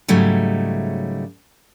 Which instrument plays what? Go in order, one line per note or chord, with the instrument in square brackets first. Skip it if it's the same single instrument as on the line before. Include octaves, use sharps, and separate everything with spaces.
[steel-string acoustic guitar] G#2 C#3 F#3 G3 A3